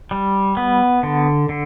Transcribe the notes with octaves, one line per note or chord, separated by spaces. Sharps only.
G3
B3
D3
D3